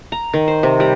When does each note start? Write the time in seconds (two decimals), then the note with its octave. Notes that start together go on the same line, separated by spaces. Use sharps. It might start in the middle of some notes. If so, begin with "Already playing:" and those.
0.12 A#5
0.34 D#3
0.48 C5
0.63 C3
0.80 G3